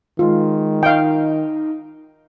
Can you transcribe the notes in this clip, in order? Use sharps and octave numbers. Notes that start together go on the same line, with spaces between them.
D#3 G#3 F4
D#4 F5 G5